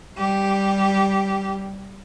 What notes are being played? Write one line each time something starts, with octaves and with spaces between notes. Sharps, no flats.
G3 G4